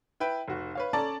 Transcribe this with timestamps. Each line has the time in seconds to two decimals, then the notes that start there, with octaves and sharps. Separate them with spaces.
0.20 E4 B4 G5
0.48 F1 F#4
0.75 B4 C#5 F5
0.93 C#4 A4 D5 A5 A#5